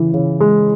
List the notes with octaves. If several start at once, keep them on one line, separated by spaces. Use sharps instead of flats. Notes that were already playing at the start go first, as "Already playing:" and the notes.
Already playing: C#3 E3
C#3
G#3